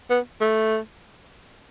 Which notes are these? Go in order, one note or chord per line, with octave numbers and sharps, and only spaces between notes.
B3
A3